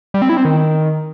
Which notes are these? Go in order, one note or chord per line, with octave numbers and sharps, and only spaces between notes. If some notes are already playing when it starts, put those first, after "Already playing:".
G3
C4
E4
C4
D#3